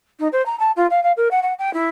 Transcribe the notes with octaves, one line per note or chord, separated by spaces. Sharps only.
D#4
C5
A#5
A5
F4
F5
F5
A#4
F#5
F#5
G5
E4